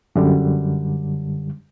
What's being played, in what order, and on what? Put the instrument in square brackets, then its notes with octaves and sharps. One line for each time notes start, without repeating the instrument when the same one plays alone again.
[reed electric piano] F#2 D3 G3